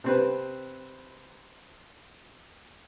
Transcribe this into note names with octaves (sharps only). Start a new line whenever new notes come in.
C3 C4 B4